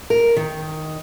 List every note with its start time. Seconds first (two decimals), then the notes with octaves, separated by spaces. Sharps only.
0.10 A#4
0.36 D#3